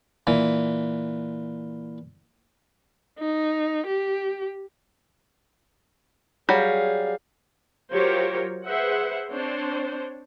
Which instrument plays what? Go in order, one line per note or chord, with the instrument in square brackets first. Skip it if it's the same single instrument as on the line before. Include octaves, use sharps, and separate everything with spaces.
[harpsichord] A#2 E3
[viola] D#4
G4
[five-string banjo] F#3 G3 [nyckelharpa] G#4 F5
[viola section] F#3 F4 G4 A#4 C5 C#5
G#4 B4 C5 E5 F#5
C4 D4 C5 C#5